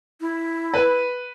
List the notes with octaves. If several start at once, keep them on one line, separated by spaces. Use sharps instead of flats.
E4
B4